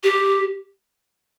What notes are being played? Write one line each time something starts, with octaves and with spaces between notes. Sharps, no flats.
G4